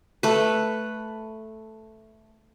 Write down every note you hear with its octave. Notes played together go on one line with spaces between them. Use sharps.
A3 B4